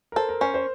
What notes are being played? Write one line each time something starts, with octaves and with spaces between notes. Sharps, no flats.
A#4
A4 C5
A#4
C#4 C5
C5